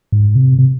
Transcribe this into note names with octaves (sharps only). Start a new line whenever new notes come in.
G#2
C3
C3